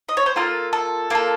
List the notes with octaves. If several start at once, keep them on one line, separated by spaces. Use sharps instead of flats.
D#5
C#5
C5
A#3 F4 A4 A#4
A4
A#3 F4 A4